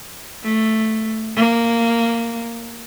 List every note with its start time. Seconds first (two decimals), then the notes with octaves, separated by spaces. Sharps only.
0.43 A3
1.36 A#3